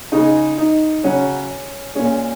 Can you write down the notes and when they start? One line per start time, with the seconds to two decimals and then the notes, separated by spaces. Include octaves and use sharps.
0.12 C#3 G#3 D#4
0.58 D#4
1.04 C#3 F#3 C#4
1.95 A#2 G#3 C#4